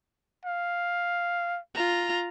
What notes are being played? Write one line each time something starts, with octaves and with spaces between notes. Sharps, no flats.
F5
F4 A#5